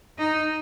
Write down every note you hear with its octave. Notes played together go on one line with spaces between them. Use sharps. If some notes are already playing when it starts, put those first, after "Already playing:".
D#4